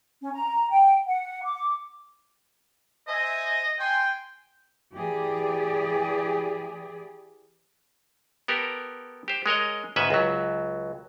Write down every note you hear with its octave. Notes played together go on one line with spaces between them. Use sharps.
C#4
A#5
G5
F#5
D6
C5 D#5 E5 G#5
G5 G#5 C6
E3 G4 G#4 D5
B3 G4 A4 A#4
G4 C5
G#3 A#4 C#5 D#5
D2 G#2 C#3 C#4 B4 E5
C#2 F#3